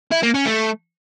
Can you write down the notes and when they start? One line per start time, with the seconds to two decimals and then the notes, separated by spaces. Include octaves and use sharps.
0.11 E4
0.23 A#3
0.34 C#4
0.46 A3